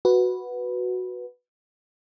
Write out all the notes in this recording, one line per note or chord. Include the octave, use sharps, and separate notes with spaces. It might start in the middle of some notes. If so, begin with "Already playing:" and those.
F#4 B4